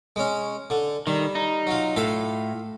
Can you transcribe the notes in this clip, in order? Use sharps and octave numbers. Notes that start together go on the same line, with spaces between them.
G#3 C#4
D3
D#3 G3
D#4
F#3 F4
A2 F4 A4